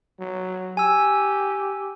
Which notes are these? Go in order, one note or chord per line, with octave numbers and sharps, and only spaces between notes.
F#3
G4 G#5 E6